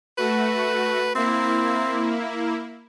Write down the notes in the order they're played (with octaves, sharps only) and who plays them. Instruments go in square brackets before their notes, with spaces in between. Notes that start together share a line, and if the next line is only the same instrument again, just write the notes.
[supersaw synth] A3 F#4 [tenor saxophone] B4
[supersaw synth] A#3 E4 [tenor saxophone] C4